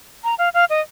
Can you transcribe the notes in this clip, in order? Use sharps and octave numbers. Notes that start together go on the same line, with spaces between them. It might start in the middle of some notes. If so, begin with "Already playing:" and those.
A#5
F5
F5
D#5